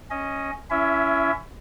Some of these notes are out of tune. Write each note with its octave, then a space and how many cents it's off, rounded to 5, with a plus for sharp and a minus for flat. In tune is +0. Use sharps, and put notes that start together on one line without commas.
C#4 -5 D#5 +10
C#4 +20 E4 +25 E5 +0